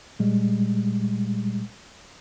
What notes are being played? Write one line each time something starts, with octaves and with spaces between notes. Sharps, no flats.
A#2 G3 G#3